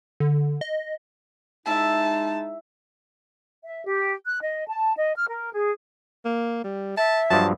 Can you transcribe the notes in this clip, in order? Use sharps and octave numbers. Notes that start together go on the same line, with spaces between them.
D3
D#5
G#3 D#4 E4 E5 A5
E5
G4
F#6
D#5
A5
D#5
F6
A#4
G#4
A#3
G3
E5 A5
G2 F3 F#3 A5